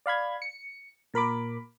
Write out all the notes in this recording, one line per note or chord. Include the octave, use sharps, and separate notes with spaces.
D5 F5 B5 G#6
C#7
A#2 A#4 B5 D6